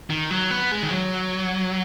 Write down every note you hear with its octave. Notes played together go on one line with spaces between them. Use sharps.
D#3
F#3
B3
G#3
D#3
F#3